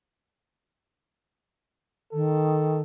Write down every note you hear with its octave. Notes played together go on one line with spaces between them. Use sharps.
D#3 A4